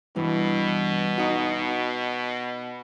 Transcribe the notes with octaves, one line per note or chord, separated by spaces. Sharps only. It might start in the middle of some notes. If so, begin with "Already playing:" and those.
G2 B2 E3
D#4 F#4